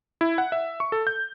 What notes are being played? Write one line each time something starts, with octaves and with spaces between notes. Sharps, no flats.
E4
F#5
E5
C#6
A4
G6